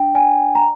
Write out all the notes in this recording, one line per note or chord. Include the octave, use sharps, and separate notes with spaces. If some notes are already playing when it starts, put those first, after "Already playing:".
Already playing: D4 G5
D5 G#5
A#5